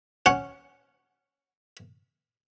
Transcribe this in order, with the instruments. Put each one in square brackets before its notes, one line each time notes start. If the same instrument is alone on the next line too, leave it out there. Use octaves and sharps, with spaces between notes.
[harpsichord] C#4 F#5